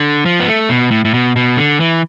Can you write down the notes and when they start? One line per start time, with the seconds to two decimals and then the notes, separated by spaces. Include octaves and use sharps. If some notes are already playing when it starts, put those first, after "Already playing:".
Already playing: D3
0.25 F3
0.40 B3
0.47 A3
0.69 B2
0.91 A2
1.05 A2
1.14 B2
1.36 B2
1.57 D3
1.80 E3